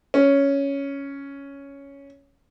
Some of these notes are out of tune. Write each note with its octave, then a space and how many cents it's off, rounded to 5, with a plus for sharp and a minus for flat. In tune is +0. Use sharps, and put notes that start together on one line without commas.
C#4 +5